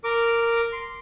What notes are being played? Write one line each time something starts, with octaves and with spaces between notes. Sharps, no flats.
A#4 D6
C6